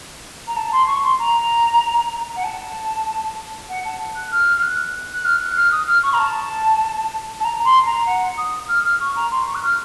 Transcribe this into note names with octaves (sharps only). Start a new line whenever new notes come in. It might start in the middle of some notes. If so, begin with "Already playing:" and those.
A#5
A5
C6
C#6
C6
A#5
F#5
A5
F#5
A5
F#6
F6
F6
F#6
F#6
F6
F#6
F6
D#6
F6
C#6
A#5
A5
A5
A#5
C6
A#5
F#5
D#6
F6
F6
C#6
A#5
C6
C#6
F#6
F6